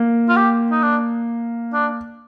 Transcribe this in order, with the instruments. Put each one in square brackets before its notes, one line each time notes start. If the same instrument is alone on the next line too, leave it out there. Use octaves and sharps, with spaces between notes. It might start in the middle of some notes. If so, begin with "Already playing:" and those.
Already playing: [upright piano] A#3
[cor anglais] F4
G4
D#4
D4
D4